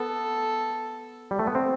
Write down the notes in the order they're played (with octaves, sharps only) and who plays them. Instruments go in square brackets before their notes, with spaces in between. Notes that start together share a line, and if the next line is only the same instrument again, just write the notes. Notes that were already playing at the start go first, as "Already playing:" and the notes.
Already playing: [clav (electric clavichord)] B3 [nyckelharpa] A4
[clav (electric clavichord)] G3
A3
B3
C4